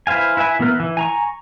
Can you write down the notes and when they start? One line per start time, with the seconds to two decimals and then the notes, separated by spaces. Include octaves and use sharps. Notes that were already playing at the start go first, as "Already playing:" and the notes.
0.07 E4 B4 C5 F5 G#5
0.37 E4 B4 E5 G#5
0.59 E3 B3 E4 A#4 B4
0.80 E3
0.97 G#5 A#5 C#6